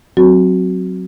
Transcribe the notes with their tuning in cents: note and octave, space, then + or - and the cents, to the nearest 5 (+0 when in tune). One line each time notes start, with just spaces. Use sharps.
F#3 +0 C4 +5 F#4 +0